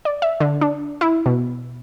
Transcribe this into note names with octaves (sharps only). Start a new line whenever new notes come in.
D5
E5
D3
D4
E4
B2